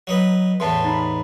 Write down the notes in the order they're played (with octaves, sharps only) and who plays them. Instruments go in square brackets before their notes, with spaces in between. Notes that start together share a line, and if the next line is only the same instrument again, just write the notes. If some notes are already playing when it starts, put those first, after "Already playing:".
[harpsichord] F#3 D#4 B4
[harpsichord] E2 A2 B3 [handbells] A5 C6
[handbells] D#4 B5